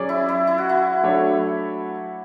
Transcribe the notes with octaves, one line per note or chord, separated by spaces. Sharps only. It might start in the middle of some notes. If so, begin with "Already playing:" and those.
Already playing: F#3 C#4 G#4 D5
E4
E4
E4
F#4
E4
F#3 A3 D4 A4 C#5